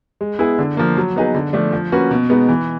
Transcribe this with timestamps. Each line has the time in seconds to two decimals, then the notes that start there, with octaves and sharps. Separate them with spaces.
0.21 G#3
0.39 B3 E4 G#4
0.59 D3
0.77 F3 A#3
0.97 F#3
1.16 B3 D#4 G#4 B4
1.35 D3
1.53 F3 A3 D4
1.73 F3
1.92 A#3 C#4 F#4 B4
2.11 B2
2.30 G#3 B3 D#4
2.49 E3